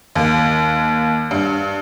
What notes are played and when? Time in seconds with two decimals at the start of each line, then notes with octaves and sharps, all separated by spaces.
0.15 D#2
1.31 G2